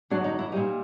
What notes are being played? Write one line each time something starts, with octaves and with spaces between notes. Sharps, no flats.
F#2 D3 F#3 D4
D#4
E4
A#2 G3 D#4